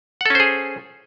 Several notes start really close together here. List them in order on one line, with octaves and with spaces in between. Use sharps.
F#5 A4 C#4 C5 G#4